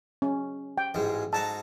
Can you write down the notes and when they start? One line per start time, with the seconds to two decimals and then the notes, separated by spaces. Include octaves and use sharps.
0.22 C#4
0.78 G5
0.94 A1 G#2 G#3
1.33 G#2 F#4 A5 A#5